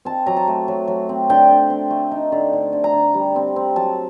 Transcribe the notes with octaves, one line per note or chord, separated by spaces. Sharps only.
C4 A5
F#3 A#5
A5
A3
F#3
F#3
C4
D3 G5
D3
C4
A3
D#4
D3
D3
D3
A#5
D3
G3
C4
C4
F#3 A5